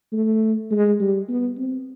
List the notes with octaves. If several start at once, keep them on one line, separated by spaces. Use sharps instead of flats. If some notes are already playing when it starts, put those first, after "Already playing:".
A3
G#3
G3
B3
C4